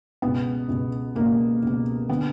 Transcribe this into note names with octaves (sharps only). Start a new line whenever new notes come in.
C#2 B2 B3
C#2 B2
C#2 B2 A#3
C#2 B2
D3 B3